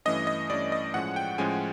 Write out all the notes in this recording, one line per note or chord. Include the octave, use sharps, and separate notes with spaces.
G2 E3 A3 C#4 D#5
D#5
G2 E3 A3 C#4 D5
D#5
A2 F3 G#3 C#4 F#5
G5
A2 F3 G#3 C#4 G#5